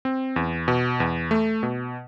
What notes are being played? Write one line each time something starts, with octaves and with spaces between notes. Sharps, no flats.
C4
E2
B2
E2
A3
B2